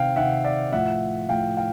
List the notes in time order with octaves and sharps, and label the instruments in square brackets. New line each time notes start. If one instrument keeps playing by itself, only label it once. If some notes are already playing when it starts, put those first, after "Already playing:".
Already playing: [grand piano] C3 D#3 F5 G5
C3 D#3 E5 F#5
D5 E5
A2 F3 E5 F#5
A2 F3 F5 G5
F5 G5